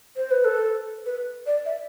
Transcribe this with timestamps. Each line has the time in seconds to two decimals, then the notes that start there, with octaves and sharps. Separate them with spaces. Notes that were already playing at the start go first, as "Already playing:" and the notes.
0.17 C5
0.31 B4
0.45 A4
1.06 B4
1.47 D5
1.66 E5